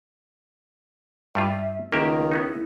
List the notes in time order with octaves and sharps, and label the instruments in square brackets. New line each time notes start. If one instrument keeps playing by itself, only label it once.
[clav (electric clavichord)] G2 G3 F4 [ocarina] E5
[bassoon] C#2 [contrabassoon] D#3 [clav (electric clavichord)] A#3 G4 E5 [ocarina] C#4
[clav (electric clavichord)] B3 C#4 D#4 [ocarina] E4